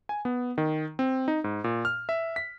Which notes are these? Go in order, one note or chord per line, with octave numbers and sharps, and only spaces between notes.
G#5
B3
D#3
C4
D#4
G#2
A#2
F6
E5
B6